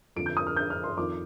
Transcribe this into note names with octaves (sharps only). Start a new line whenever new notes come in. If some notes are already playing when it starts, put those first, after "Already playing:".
F2 D3 F3 D7
G6
D#6
F6
G6
F6
C6
F2 D#3 D6